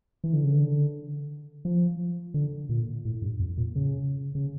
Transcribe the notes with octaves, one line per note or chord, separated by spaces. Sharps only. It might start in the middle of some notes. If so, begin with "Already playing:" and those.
E3
D3
C#3
D3
F3
D3
A#2
A2
G2
F2
A#2
C#3
C#3